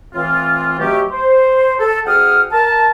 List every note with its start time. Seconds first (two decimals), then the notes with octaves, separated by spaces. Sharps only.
0.14 A2 E3 C4 F4
0.80 B2 F#3 A3 C#4 G4
1.11 C5
1.78 A4
2.06 D2 G#4 F#5 G5 D#6 F6
2.51 A#4 A5